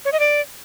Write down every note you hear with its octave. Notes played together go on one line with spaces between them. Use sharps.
C#5
D#5
D5